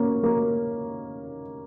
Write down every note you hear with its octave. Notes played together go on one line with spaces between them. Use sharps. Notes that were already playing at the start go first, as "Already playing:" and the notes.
Already playing: A#3 C#4
A#3